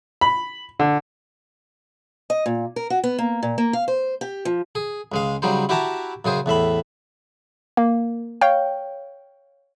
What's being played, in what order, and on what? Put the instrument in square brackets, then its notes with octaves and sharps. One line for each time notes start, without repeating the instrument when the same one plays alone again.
[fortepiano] B5
D3
[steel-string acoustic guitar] D#5
A#2
A#4
F#4
B3
A#3
A#2
A#3
F5
C5
G4
F3
[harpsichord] G#4
C#2 G#3 F5
C#3 F#3 G3 D#4 C5
E4 F#4 G4 E5 A5 A#5
F#2 C#3 G#4 C5
E2 A2 E5 B5
[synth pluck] A#3
C#5 F5 G5